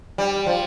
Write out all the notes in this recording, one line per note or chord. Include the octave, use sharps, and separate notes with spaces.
G3
F3